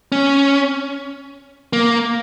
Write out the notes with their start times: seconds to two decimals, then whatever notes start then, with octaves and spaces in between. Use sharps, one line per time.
0.12 C#4
1.73 A#3